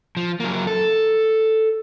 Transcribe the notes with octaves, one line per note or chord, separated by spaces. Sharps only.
F3
F#3 A#3
A4